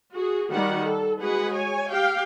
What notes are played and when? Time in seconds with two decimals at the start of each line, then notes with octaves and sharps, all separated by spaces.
0.12 F#4 G#4
0.52 D#3 G3 F#4 F#5
0.83 A4
1.20 G#3 F#4 G#4 B4 F#5
1.54 C#5 G#5
1.91 G4 F5 G5